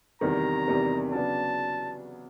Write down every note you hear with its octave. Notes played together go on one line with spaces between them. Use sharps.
E2 C3 D#3 G3 A#5
E2 C3 D#3 G3
C#3 F#3 B3 D4 A5